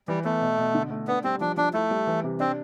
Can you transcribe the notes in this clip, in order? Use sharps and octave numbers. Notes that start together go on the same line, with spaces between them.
E3 G3
A3 B3
B2
B2
D3
A3
B3 D4
G3 C4
F3 D4
F3 D4
A3 E4
G3
E3
C3
C4 D4